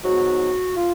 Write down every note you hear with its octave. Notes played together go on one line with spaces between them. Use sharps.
G#2 F#3 B3 D#4 F#4
F4